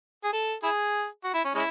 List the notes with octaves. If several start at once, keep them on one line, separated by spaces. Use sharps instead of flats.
G#4
A4
E4 G#4
F#4
E4
C#4
G#3 C#4 E4